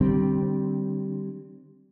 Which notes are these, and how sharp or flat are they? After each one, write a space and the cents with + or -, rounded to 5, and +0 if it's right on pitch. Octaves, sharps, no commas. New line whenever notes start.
D3 +20 G3 -15 C4 +0